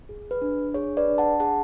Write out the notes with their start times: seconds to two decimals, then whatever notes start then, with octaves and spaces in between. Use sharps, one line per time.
0.09 G#4
0.31 B4
0.42 D4
0.74 G#4 C#5
0.97 B4 D5
1.07 D4
1.18 F#5 A5
1.40 G#4 F#5 A5